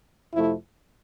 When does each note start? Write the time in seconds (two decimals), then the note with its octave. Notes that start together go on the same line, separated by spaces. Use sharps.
0.34 F2 C3 F3 A3 E4